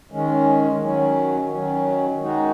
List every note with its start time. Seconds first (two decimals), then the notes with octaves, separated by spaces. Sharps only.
0.11 D#3 G#3 C#4
0.81 D#3 F#3 C#4
1.50 D#3 F#3 C#4
2.20 D#3 G#3 D#4 F#4